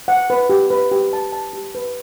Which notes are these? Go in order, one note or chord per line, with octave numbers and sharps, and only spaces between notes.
F#5
B4
G4
B4
G4
A5
A5
G4
B4